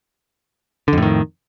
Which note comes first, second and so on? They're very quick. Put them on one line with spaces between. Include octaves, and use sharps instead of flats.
D3 F2 A2 D#3